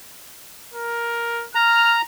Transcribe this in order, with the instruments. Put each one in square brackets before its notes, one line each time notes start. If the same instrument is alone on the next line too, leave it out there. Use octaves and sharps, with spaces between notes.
[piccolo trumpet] A#4
[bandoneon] A#5 [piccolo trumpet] F6